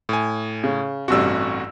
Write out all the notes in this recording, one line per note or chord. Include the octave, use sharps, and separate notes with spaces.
A2 G#5
C#3
A1 G2 C3 F#4 E6